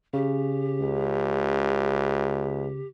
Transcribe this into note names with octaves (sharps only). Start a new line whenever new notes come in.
C#3 G4
C#2